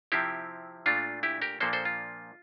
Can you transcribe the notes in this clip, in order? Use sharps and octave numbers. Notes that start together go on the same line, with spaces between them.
C3 F3 C4 E4 G4
A#2 A3 D4 F4
E4 G4
G4 A#4
A#2 F3 A#3 D4 A4 C5
A4 C5
F4